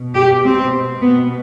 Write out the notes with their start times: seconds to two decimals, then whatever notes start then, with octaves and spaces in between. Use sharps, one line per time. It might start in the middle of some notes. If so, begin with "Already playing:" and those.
Already playing: B2
0.15 G4
0.44 C4
1.02 B2 B3